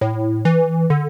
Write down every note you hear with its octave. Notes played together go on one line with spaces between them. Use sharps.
A2
E3
D3